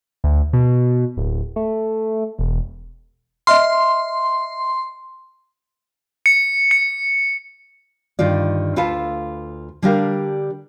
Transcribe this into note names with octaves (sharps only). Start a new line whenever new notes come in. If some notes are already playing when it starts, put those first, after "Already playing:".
D2
B2
D1
A3
E1
D#5 E5 C6 F6
C#7
C#7
G2 D3 D#3 F4 D5
D2 F4 A4 B4 F5 A5
D3 G3 D4 G4 A#4 F5